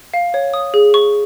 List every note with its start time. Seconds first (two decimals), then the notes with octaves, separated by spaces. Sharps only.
0.14 F5
0.34 C#5
0.54 D#6
0.74 G#4
0.94 C#6